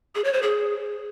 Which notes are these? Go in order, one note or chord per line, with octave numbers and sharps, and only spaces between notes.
G#4
C#5
C5
G#4